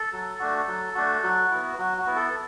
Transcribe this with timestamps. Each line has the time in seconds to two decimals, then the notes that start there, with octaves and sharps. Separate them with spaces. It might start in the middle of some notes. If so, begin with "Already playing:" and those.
Already playing: A4
0.12 F#3
0.39 A3 D4 F#4
0.67 F#3
0.95 A3 D4 F#4
1.23 F#3 F#4
1.51 B3 E4
1.78 F#3 F#4
1.98 F#4
2.07 B3 E4
2.16 A4